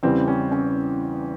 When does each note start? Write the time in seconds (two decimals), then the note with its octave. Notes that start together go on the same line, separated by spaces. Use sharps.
0.03 E2 C#3 E3 G3 C4
0.28 C#4
0.52 C#4